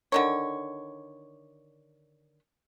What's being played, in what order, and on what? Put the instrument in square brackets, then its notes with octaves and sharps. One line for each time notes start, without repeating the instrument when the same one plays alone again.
[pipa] D3 D#3 C#5